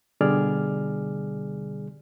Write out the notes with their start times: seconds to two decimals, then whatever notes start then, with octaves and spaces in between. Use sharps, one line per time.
0.21 B2 D3 G3 G#4 D5 F6